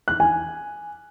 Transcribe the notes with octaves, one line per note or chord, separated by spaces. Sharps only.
F#6
G#5